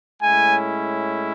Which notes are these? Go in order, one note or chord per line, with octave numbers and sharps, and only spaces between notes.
A2 G#3 C#4 E4 G#5